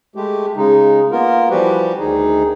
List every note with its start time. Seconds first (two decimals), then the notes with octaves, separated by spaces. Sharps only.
0.15 G#3 A3 G4
0.57 C#3 G#3 D#4
1.11 A#3 B3 F4 A#4
1.50 E3 F3 G3 F#4 G4 B4
1.99 D2 D#3 D#4 G#4